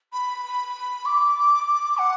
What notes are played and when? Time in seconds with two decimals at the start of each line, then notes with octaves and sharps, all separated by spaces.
0.13 B5
1.06 D6
1.98 F#5